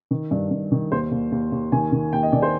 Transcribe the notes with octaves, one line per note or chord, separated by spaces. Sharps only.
D#3
G2
G2
D#3
D#2 C5
D#2
D#2
D#2
D#3 G#5
D#3
D#2 G5
D#5
D#3 D5
C5